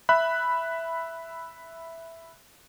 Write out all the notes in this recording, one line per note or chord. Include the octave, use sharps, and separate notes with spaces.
E5 B5 F#6